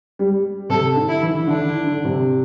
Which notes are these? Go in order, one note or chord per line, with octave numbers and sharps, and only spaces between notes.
G3
C3 A4
D3
E4
E3
E3
D3 D4
D3
D3
C3